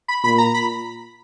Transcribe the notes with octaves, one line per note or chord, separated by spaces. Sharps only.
B5
A#2 B5
A#5
B5